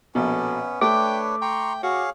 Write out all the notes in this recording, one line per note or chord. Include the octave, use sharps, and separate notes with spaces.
A#1 B2 B3 C#4 A4
A3 D4 B4 C#5 G5 D6
G5 A#5 C6 C#6
F#4 G#4 C#5 F5